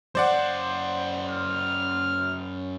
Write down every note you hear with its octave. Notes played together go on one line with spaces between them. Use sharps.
F#2 C5 D5 F5 F#5
F6